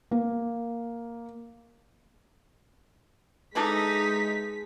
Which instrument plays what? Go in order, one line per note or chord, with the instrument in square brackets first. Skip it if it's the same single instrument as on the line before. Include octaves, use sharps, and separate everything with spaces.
[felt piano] A#3
[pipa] E3 D4 A4 [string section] G#3 B6 [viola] D#4